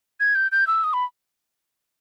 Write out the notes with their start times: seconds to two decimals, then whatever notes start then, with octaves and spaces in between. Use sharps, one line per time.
0.20 G#6
0.35 G6
0.52 G6
0.67 E6
0.84 D#6
0.93 B5